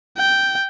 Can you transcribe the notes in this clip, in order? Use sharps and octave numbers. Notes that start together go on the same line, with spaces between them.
G5